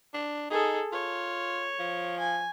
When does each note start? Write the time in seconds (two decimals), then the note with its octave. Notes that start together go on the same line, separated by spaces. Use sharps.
0.14 D4
0.50 D#4 G#4 A4
0.93 F4 C#5
1.79 F3
2.19 G#5